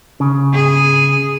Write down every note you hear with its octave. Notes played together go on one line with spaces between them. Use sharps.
C#3
G#4